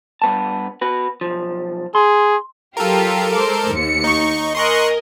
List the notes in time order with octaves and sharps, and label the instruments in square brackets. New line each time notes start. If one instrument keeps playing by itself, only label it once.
[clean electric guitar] G2 B3 A5
B3 F#4 B4
B1 F3
[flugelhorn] G#4 [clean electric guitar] C6
[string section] F#3 F4 G4 [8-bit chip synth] A4 A#4
[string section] G#3 C5 D6
D#2 C#7
[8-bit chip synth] D#4 C#6
[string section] A#4 D#5 G#5 [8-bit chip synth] C6 C#6 F#6